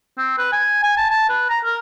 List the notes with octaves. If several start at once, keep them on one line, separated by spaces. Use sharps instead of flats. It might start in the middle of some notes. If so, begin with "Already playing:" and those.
C4
B4
G#5
G#5
A5
A5
B4
A#5
A#4